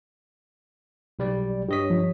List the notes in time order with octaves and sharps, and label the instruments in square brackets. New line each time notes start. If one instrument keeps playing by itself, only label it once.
[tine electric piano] B1 G3 D5
[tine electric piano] G2 D#5 B6 [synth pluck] G4 C#5 D#6
[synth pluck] F3